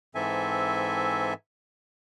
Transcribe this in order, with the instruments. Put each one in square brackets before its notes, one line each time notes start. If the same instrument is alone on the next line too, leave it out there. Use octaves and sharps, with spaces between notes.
[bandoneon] G#2 E3 C4 A4 E5 G#5